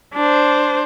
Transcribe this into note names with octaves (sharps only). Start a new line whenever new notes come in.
D4 C5